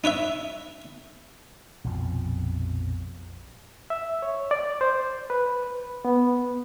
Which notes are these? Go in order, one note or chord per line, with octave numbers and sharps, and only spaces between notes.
D#4 B4 C#5 E5
A#1 F2 B2 F3
E5
C#5
D5
C5
B4
B3